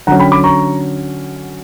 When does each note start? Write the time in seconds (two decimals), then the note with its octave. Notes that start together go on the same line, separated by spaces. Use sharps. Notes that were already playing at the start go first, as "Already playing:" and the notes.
0.07 D3 F#3 C#4 F#5 A#5
0.20 G5 B5
0.32 B5 D6
0.44 A#5 C#6